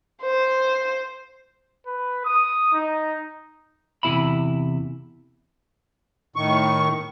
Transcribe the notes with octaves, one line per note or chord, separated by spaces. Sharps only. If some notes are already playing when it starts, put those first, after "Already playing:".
C5
B4
D#6
D#4
E2 C3 D4 E4 E5 B5
A2 D#3 C#6